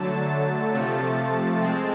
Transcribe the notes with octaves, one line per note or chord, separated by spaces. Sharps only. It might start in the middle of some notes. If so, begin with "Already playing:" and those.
Already playing: D3 F#3 A3 A5
C3 F3 A3
G#3 C4